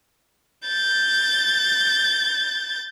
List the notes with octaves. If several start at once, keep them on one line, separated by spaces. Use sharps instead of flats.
G6 A6